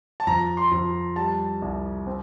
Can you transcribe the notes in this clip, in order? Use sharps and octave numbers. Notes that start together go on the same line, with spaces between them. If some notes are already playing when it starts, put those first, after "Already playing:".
A5
F2 A#5
C6
F2
G3 A5
C2
C4